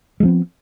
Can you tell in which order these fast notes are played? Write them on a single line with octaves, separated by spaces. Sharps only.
G#3 F3 C4 B3